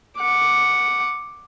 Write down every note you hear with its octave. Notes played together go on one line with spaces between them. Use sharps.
F#5 D6